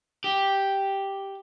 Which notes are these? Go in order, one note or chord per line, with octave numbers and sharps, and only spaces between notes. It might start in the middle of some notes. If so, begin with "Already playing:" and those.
G4